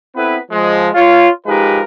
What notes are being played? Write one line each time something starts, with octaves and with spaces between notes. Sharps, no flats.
B3 C4 E4 A4 B4
F3 G#3
F4 C#5
F3 G#3 D#4 G4 A#4 B4